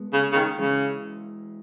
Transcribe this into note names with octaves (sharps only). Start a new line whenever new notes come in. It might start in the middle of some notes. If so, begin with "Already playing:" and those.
Already playing: G#3 B3
C#3
C#3
D#3
C#3 E3 G#3